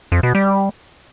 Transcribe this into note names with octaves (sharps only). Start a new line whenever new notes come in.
F2
B2
G3